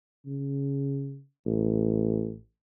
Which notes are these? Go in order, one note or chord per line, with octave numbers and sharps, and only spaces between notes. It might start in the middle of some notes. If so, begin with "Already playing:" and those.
C#3
A1